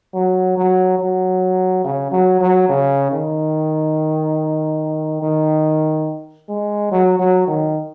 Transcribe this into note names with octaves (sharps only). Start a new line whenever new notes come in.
F#3
F#3
F#3
C#3
F#3
F#3
C#3
D#3
D#3
G#3
F#3
F#3
D#3